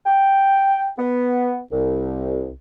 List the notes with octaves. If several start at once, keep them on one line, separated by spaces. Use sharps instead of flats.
G5
B3
C2